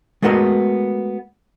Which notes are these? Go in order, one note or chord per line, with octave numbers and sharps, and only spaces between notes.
G#3 A3 B3 F#4 A#4 D#5